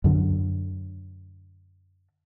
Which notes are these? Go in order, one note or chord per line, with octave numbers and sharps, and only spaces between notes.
F#2 D3